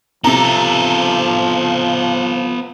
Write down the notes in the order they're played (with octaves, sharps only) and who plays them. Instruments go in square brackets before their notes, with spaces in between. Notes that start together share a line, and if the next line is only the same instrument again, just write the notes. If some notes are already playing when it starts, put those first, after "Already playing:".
[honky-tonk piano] C3 A#5 [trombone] F3 [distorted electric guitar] B3 A4